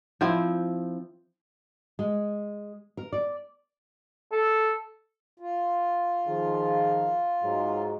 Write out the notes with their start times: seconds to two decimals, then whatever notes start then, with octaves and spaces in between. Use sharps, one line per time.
0.21 F3 C4 E4
1.99 G#3
2.97 A#4
3.12 D5
4.32 A4
5.40 F4
6.27 D#3 F3 G#4
7.43 G#2 F#3 G#3